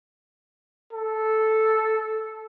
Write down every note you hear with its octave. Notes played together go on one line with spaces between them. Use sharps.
A4